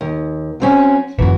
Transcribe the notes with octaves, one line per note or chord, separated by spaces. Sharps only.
D#2
F#3 C4 C#4
G1 F#2 E3 F#4